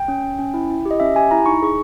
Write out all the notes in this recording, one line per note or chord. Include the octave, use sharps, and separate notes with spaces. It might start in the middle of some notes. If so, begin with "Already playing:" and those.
Already playing: G5
C#4
C#4
C#4
E4
E4
G4
D#5
C#4 E5
G4 G#5
E4 A#5
D#4 C#6
G#4 C#6